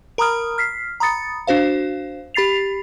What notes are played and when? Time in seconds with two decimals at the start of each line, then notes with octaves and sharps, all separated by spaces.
0.18 A#4 A#5 B5 D#6 F6
0.58 F6 B6 C7
1.00 A#5 B5 D#6 A6 C#7
1.47 D4 F#4 C5 F5
2.34 G4 B5 A6 C7 F7